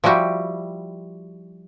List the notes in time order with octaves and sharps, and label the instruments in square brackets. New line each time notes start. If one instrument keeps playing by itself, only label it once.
[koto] F3 G3 E4 F#4 G4